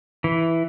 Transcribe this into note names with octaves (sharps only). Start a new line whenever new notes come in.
E3